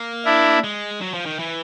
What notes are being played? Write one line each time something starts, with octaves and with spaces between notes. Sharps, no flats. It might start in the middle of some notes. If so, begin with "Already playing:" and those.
Already playing: A#3
D4 E4
G#3
F#3
F3
D#3
E3